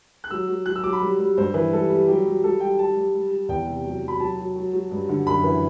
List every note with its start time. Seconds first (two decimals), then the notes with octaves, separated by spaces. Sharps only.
0.24 F#6
0.31 F#3 E6
0.48 F#3
0.66 F#3 F#6
0.76 E6
0.84 F#3 D6
0.93 B5
1.02 G3
1.19 G3
1.37 G2 C5
1.54 E3
1.73 G3 A4
1.90 G3
2.07 F#3 G4
2.25 F#3
2.44 G3 A4
2.60 G3 G5
2.79 G3 A5
2.96 G3
3.14 G3
3.31 G3
3.49 E2 G5
3.67 C3
3.85 F#3
4.03 F#3
4.08 B5
4.20 F#3 A5
4.38 F#3
4.56 F#3
4.73 F#3
4.91 G2
5.09 D3
5.27 F#2 B5
5.44 E3